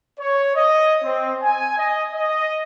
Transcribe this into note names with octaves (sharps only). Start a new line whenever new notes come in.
C#5
D#5
C4
G#5
D#5
D#5